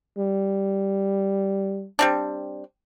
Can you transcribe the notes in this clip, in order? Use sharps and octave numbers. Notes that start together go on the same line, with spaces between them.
G3
G3 C4 D4